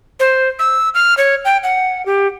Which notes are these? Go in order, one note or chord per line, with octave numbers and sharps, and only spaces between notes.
C5
E6
F6
C#5
G5
F#5
G4